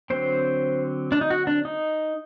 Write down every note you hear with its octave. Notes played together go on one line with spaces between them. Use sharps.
D3 F#3 C4 C5
D4
D#4
F#4
D4
D#4